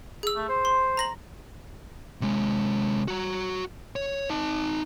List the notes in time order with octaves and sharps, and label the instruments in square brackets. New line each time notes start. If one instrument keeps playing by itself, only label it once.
[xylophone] G#4 E6
[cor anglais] A3
C5
[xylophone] C6
A#5 A#6 F#7
[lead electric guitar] C3 G#3
F#4 A#5
C#5
D#4 A5